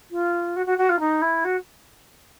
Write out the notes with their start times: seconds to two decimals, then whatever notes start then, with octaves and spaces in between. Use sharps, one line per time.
0.11 F4
0.56 F#4
0.66 F#4
0.78 F#4
0.89 F4
1.00 D#4
1.22 E4
1.44 F#4